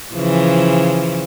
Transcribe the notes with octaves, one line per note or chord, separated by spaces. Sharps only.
C#3 E3 F3